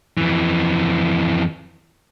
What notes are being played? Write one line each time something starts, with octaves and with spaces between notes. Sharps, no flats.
F2 E3